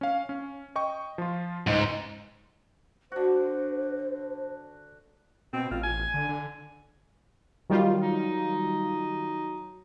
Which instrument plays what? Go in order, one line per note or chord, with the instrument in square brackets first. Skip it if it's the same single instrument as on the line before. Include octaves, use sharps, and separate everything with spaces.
[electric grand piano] C#4 F5
C#4
D#5 G5 C#6
F3 F4
[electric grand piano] C#2 [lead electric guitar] G#2
[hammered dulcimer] D3 F#4 [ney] C5
[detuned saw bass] B2 [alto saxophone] C4
[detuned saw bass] A1 [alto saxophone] F4
[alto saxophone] G#5
[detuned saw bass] D3
D3
[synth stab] D#3 G3 F4 [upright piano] F#3
[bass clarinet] D#4